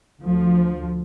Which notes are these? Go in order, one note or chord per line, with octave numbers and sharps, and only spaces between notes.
D2 F3